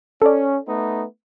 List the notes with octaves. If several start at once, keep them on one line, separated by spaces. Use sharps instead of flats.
C#4 A4 D5
A3 B3 D#4